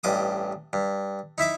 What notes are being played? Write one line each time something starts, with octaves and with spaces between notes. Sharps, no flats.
A1 G2 D#5 D6 D#6
G2
D#4 E4 E5 D6